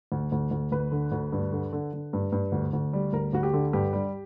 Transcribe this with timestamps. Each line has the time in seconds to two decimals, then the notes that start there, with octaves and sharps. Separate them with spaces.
0.12 D2
0.32 D2
0.51 D2
0.72 D2 B4
0.92 D3
1.12 D2
1.32 G2
1.52 D3
1.73 D3
1.93 D3
2.13 G2
2.32 G2
2.52 D2
2.73 D2
2.93 G3
3.13 D2 A#4
3.33 D2 F#4
3.43 G4
3.53 D3
3.73 G2 G4
3.93 G3